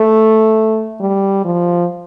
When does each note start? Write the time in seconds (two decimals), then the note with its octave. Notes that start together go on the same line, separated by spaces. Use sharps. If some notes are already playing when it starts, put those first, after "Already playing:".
Already playing: A3
1.01 G3
1.45 F3